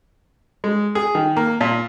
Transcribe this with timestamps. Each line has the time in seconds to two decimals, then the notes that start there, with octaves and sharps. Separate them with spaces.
0.64 G#3
0.95 G#4
1.15 D#3
1.36 A#3
1.61 A#2